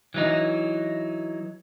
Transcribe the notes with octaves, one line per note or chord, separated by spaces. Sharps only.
E3 F#3 D#4